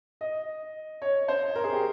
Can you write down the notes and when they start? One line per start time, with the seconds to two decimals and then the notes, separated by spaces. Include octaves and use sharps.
0.21 D#5
1.02 C#5
1.28 C5
1.55 A#4
1.64 G#4
1.72 G4